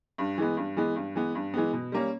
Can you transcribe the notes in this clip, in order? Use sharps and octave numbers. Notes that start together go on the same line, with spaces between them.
G2
E3 G#3 B3
G2
E3 G#3 B3
G2
E3 G#3 B3
G2
E3 G#3 B3
B2
G3 A#3 C#4